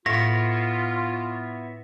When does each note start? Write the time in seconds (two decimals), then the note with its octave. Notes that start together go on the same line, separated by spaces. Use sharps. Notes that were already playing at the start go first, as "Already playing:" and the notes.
0.06 A2 B3 E4 F4 C#5 A#6